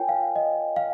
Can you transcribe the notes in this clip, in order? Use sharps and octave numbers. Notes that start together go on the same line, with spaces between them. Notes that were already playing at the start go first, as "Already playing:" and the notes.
Already playing: F4 A#4 C#5 G5 G#5
F5
D#5
F5